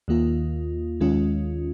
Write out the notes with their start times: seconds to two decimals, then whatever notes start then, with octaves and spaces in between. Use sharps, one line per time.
0.08 D#2 D#3 A#3 F4
1.01 D#2 D#3 G#3 C#4 F4